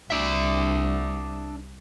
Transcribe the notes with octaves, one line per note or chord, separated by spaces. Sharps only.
C2 D4 E5